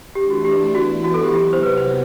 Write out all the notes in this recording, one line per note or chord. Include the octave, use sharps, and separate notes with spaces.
E3 A3 D4 G4
F#4
G4
E3 B3 E4 F#4 B4
F#4
A4
G4
C3 F#3 B3 G4
C5
B4
C5